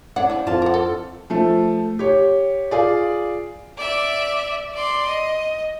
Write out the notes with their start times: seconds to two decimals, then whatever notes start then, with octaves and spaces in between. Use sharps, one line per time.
0.16 D4 C#5 F#5
0.30 C#3 F3
0.47 F2 F4 A5
0.62 A#4 F#5
0.74 A4
1.30 F3 A3
1.99 G4 C#5
2.71 F4 G#4 D5
3.77 D5 E5
4.74 D5 C6
5.08 D#5